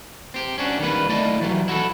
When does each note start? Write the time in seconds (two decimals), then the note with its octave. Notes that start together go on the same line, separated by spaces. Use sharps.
0.34 C4 G4
0.58 C#4 D4 F#4
0.79 D#3 G3 A#3 B4
1.09 A3 E4 D5 D#5 A5
1.41 E3 F#3 G3
1.68 E4 F#4 G4 A4